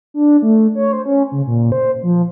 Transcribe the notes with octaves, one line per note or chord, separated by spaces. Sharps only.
D4
A3
C#5
C5
C#4
C#3
A#2
C5
F3